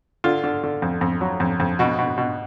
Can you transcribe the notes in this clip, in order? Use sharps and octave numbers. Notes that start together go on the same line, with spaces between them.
D3 F4
D3
D3
F2
F2
F#3
F2
F2
B2 F#4
B2
B2